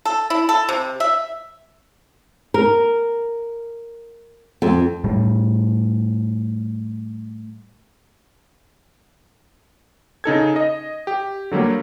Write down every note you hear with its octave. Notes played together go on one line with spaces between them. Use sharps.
A4
E4
A4
C3
E5
A#4
F2
A2 G3
C#3 D#4 A4 G#6
D#5
G4
D3 F#3 G3 A#3